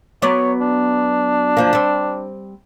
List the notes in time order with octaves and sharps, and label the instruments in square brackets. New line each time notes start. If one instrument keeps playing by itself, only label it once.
[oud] F#3 B3 D5 [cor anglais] C#5
[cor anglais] D4
[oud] F#2 F3 A#3
G3 C4